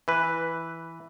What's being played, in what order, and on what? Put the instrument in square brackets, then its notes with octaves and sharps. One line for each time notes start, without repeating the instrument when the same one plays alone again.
[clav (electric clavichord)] E3 B4